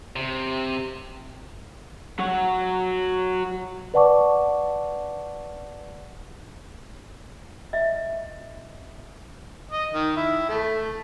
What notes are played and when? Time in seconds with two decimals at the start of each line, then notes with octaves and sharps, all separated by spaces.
0.16 C3
2.19 F#3 F#4
3.94 B4 D5 F#5 A5 C#6 D6
7.73 D#5 E5
9.71 D#5
9.94 D#3
10.17 E4
10.49 A3